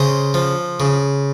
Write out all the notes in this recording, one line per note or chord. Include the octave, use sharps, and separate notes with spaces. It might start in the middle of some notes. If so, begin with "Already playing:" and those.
Already playing: C#3 C5 D#5
F3
C#3